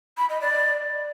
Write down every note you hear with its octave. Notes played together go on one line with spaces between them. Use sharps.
B5
D#5
D5